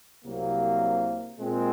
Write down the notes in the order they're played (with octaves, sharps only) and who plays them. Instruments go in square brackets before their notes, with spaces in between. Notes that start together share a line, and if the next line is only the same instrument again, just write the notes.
[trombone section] C2 C3 F#3 A#3
A#2 G#3 C4